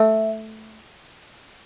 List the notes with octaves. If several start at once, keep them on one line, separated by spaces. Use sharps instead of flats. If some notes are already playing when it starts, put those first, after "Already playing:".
Already playing: A3 E5